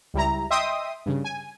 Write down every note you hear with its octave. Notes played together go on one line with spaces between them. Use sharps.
C#2 G3 E4 A#5
D#5 E5 G5 C6 D#6
G2 C#3
G#5